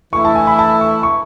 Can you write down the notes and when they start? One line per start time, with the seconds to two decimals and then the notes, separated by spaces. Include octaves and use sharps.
0.13 E3 A3 E4 C#6
0.25 A5
0.35 G#5
0.47 B5
0.59 A5
0.81 C#6
1.03 C#6